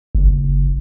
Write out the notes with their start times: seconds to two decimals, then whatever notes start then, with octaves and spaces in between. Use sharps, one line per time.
0.15 F#1